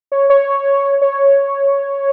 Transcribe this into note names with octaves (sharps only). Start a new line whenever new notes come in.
C#5
C#5
C#5